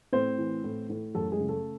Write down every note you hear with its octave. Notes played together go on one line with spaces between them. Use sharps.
A2 C4 C5
E3
A2
A2
F#2 A3 A4
G#3 G#4
C#3
A3 A4